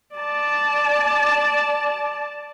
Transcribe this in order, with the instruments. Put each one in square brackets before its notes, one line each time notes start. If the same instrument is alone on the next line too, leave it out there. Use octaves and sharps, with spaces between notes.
[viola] D5 A5